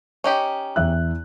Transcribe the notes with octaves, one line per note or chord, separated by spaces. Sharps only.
C#4 D#4 G4
E2 E5 F#6